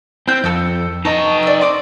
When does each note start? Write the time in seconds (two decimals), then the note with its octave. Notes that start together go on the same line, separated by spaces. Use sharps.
0.28 C4 E4 G6
0.44 F2 A4 E6 G6
1.05 D#4 B4 D#5 A5 A#5 C#6
1.43 D5 E6
1.61 C4 D5 D#6